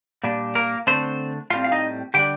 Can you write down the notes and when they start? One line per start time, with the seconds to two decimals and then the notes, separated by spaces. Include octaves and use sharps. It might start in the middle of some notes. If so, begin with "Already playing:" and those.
0.24 A#2 G3 D4
0.55 A#3 A#4
0.87 D3 A3 C4 D4 C5
1.50 A2 G3 C4 F4 F5
1.64 F5
1.72 D#4 D#5
2.14 D3 G3 D4 G4 G5